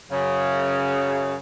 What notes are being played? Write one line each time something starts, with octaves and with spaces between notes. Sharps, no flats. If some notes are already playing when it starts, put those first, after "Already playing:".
F#2 C#3